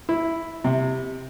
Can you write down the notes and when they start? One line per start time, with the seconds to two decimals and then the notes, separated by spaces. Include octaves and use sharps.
0.09 E4
0.64 C3